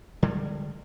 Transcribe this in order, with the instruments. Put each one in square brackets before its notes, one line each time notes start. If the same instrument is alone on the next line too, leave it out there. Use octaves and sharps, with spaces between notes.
[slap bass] D3 G3 G#3